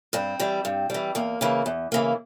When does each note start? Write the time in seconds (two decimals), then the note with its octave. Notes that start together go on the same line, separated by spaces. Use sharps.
0.13 G2 C4
0.39 E3 G3
0.65 G2
0.90 E3 G3
1.15 E2 A#3
1.41 C#3 E3 A#3
1.66 E2
1.92 C#3 E3 A#3